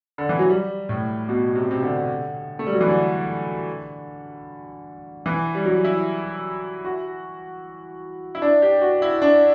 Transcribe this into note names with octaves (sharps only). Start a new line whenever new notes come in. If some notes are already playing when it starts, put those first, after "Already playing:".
D3
E3
F#3
G3
A2
B2
C3
C3
D3
A3
G3
F#3
E3
D3
E3
G3
F#3
E4
F#4
E4
D4
G4
F#4
E4
D4